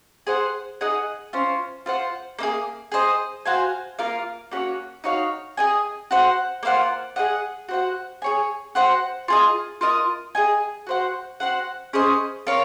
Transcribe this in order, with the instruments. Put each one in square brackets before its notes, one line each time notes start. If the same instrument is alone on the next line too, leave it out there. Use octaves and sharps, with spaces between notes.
[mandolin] G#4 C5 F#5
D#4 G#4 D#5 F#5
C#4 F4 C5
F4 C5 F#5
A#3 D#4
G#4
G#4 C5 D#5
F#4 C5 F5 G#5
A#3 F4 A#4 F5
A#3 C#4 F#4 C#5
D#4 F#4 C#5 F5
G#4 D#5 G#5
F#4 C5 F#5
A#3 F4 C5 F#5
G#4 D#5 F#5
F#4 C5 F#5
G#4 C#5 G#5
F#4 C5 F#5
F4 G#4 D#5
F4 A#4 D#5
G#4 D#5 G#5
F#4 C5 F#5
F#4 C5 F#5
C#4 G#4 C5 D#5
F4 A#4 C#5 F5